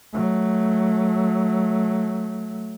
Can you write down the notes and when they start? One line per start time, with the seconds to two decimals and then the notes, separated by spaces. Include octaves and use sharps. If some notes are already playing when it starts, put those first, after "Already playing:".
0.13 F#3 A3